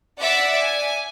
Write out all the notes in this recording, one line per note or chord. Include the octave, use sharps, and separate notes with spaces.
D5 E5 F#5 D6
G#5